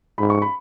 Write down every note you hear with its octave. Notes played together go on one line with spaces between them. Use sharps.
G#2 B5
C#6
B5